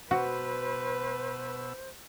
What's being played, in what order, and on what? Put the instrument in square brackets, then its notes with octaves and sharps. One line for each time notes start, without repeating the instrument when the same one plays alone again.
[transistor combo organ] B2 E6 [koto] F#4 [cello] B4 [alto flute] C5